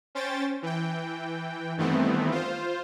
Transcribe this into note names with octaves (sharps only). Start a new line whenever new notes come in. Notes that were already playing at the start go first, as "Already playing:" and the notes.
C#4 C5 G5 A6
E3 G5
G2 D#3 E3 A3 B3 C4
F4 C5